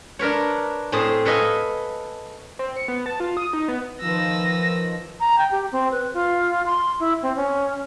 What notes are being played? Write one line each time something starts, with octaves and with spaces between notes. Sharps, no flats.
D4 A#4 B4 C#5
A2 C4 G#4 C5 A5
A4 B4 C#5 D#5 F5 G#5
C4
C#7
B3
A5
F4
D#6
D#4
B3
D#3 F3 B4 E6 A#6
A#5
G5
G4
C4
B4
F4
C6
E4
C4
C#4